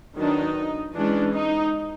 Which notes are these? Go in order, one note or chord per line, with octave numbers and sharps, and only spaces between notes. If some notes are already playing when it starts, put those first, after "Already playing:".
D#3 F#3 B3 D4 D#4
E3 G#3 C#4 D4
D#4